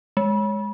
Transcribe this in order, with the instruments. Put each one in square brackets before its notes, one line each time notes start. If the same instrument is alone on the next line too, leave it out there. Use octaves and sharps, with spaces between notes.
[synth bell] G#3